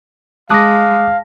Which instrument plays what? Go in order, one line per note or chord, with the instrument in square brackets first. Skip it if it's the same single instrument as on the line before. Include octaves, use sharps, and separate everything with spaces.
[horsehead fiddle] G#3 [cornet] F5 [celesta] A5 A#6 [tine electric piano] D6 D#6 F#6